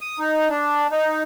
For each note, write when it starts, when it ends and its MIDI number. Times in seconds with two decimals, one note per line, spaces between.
0.01 0.19 87
0.19 0.49 63
0.49 0.87 62
0.91 1.23 63